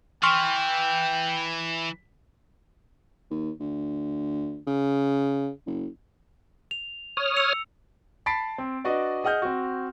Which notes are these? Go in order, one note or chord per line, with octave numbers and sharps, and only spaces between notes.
E3 G5 C6 C#6 F6
D#2
D2
C#3
F#1
F7
C#5 D#6 F6
E6 C#7 F7
A5 B5 A6 B6 C7 D7
C4
D4 F#4 B4 D5 D#5
G#4 D#5 F#5 F6 G6
C4 F#4